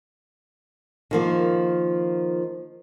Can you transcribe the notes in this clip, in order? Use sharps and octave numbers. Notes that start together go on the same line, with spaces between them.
D#3 F3 A#3